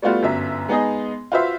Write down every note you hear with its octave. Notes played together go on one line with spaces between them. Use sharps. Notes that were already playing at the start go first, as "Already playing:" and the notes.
G3 A3 B3 F4 F#4
G1 F#2 E5
G#3 B3 D#4 G#4 D#5
F4 F#4 B4 C5 E5